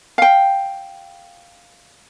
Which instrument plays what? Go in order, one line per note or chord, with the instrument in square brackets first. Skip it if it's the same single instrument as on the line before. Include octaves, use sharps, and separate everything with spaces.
[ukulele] F5 G5